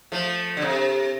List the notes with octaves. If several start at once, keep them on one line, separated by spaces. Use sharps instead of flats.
F3 A3
D3
C3